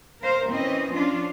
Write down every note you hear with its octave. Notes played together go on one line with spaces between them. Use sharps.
A#4 C5 F5
E3 C4 C#4 D#5
F3 C#4 D4 F4